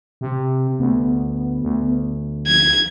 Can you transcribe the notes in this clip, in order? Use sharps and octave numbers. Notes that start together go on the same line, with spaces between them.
C3
D2 B3
D2
F3 G#6